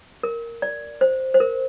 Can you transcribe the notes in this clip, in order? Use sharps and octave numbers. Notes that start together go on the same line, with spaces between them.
A#4
D5
C5
C5
A#4